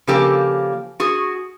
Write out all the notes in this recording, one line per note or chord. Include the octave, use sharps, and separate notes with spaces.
C#3 F3 A#3 G4 A4
F#4 G#4